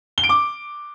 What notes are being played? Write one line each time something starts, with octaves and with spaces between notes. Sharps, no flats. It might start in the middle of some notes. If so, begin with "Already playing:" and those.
G7
D7
D6